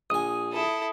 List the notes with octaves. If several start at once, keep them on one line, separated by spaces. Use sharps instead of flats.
A#1 G#5 D#6
E4 A4